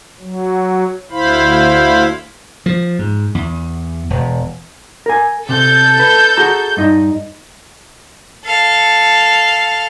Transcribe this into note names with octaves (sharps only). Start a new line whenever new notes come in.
F#3
D2 E4 C5 F5 B5
F3
G#2
E2
E1
A#4 G#5
C3 A4 G6
B4
F#4 G#4 A#5
G2 D#4
A4 F5